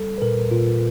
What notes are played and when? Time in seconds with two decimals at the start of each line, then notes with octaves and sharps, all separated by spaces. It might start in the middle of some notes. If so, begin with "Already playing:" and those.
Already playing: G3 A4
0.18 B4
0.22 A#2 A#4
0.51 A#2 F4